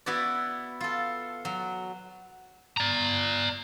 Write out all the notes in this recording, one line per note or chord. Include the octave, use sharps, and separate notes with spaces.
B3 E4 F#4 B4 D5
F4 A4
F#3
D5 A#5